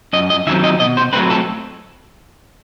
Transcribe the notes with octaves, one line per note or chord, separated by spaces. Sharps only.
F#2 D#5
D#5
D#3 F#3 C4 E5
D#5
B2 D#5
C5
F#3 A3 C4 B4
A4